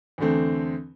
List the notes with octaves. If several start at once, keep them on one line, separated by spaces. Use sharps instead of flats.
E2 D3 A3 C4